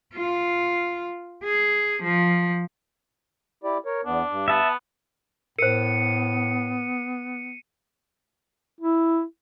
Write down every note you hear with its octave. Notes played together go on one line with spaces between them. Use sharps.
F4
G#4
F3
E4 G4 D5
A#4 C#5
E2 B3 D4
G2
B3 E5 A5
A2 B3 A#4 C5 C7 C#7 D#7
E4